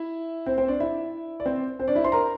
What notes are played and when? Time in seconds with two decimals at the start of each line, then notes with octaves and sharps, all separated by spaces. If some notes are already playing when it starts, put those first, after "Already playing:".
Already playing: E4 E5
0.46 C4 C5
0.58 C4 C5
0.68 D4 D5
0.80 E4 E5
1.40 D5
1.46 C4 C5
1.79 C4 C5
1.88 D4 D5
1.95 E4 E5
2.04 C5 C6
2.12 A#4 A#5